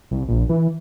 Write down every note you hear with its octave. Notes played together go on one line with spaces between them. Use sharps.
C2
A#1
E3